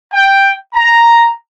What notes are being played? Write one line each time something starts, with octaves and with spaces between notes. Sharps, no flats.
G5
A#5